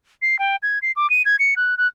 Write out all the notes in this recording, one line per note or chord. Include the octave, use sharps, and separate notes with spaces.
C7
G5
G#6
C7
D6
D#7
G#6
C#7
F#6
F#6